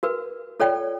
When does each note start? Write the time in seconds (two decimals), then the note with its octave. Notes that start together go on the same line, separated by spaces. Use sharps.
0.03 F#4 A#4 B4
0.60 F4 A4 C#5 D5 G5